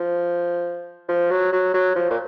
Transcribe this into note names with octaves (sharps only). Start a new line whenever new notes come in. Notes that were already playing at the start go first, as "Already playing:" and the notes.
Already playing: F3
F3
F#3
F#3
F#3
F3
A#2